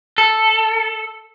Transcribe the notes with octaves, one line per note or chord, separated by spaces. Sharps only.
A4